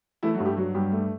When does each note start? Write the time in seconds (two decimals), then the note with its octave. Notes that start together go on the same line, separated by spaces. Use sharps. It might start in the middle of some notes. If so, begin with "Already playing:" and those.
0.23 E3 A3 E4
0.34 F#3 F#4
0.40 G2
0.45 G3 G4
0.57 F#3 F#4
0.74 G2 G3 G4
0.92 A3